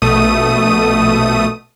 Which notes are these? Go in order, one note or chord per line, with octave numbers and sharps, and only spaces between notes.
A#1 B2 A3 D#6 D#7